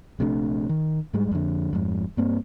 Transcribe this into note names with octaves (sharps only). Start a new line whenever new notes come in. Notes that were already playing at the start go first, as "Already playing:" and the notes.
A#1 C3 A3 D4
D#3
G#2 G3 G#3
F2 D3
F2 G#2
G2 A#3 C4